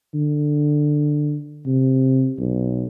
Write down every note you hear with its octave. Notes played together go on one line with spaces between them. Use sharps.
D3
C3
B1